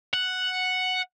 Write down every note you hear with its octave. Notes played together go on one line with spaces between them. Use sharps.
F#5